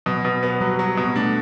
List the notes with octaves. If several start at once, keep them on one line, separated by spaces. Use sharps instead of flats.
B2 F#3
B2
B3
F#3 G3
F#3
B2
B3
A3 D4